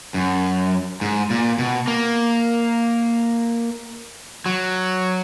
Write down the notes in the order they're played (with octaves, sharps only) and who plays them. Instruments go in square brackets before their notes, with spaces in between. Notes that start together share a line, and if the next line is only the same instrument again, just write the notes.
[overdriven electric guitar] F#2
G#2
A#2
B2
A#3
F#3